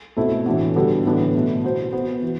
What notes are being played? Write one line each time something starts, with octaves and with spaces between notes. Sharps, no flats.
B2 A3 C4 E4 A4
A2 E3 A3 D4 F#4
D3 G3 B3 F#4 B4
A2 E3 B3 D4
B2 A3 E4
B3 F#4 C5
B3 F#4 C5
E3